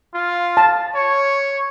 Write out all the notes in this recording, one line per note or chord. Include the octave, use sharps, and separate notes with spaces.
F4
A5
C#5